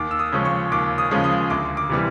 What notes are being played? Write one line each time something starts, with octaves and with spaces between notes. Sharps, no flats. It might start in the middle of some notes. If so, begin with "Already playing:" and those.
Already playing: D#2 D6
E6
D#6
C#3 F3 G#3 C#4
C#6
D#2 D6
D#6
C#3 F3 G#3 C#4
D#6
D2 D6
D6
C3 E3 G3